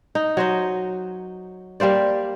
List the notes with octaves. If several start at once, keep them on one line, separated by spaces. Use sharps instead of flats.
D#4
F#3 C5 D#5
G3 A#3 C5 D5